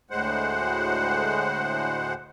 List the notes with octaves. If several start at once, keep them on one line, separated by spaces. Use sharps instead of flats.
D2 A2 G#3 C5 F#5